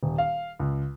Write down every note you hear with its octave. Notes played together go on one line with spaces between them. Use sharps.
D#1
F5
C#2